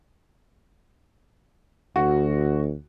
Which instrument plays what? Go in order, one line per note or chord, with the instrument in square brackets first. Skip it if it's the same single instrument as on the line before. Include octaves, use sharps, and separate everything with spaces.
[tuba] D2 [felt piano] F#4